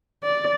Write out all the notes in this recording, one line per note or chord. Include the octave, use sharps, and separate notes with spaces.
D5